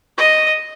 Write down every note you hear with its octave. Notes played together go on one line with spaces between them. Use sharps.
D#5